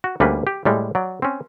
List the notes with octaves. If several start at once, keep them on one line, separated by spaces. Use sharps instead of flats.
F#4
D2 G3 A#3 C#4 B4
G4
A2 G3 G#3
F#3 D5
C4 C#4